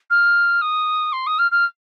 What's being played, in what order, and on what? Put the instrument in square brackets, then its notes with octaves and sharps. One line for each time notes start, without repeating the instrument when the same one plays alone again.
[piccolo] F6
D#6
C6
D#6
F6
F6